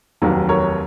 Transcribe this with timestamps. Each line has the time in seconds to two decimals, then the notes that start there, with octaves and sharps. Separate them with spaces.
0.22 F1 D#2 D#3 F#3
0.49 A#4 C#5